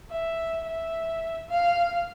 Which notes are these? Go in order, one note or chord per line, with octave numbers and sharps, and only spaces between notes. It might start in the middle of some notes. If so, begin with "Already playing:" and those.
E5
E5
F5